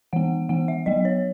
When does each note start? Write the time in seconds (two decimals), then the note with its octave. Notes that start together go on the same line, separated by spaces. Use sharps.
0.13 E3 B3 F#5
0.49 E3 B3 F#5
0.68 E5
0.86 F#3 B3 D#5
1.05 C#5